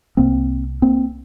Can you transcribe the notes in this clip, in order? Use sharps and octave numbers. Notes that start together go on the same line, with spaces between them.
C2 C3 A#3 C4
A#3 C4